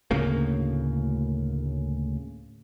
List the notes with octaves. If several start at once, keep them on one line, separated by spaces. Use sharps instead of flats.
D2 A2 C#3 A#3